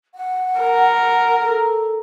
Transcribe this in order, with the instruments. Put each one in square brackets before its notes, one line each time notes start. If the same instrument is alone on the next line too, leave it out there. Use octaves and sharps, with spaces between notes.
[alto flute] F#5
[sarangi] A#4
[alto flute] A4